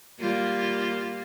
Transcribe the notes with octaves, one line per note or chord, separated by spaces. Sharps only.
G3 A#3 F4